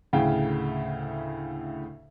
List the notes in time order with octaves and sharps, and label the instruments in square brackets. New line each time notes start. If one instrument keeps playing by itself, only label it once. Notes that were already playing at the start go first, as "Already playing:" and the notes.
[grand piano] D2 A2 C#3 F5 G5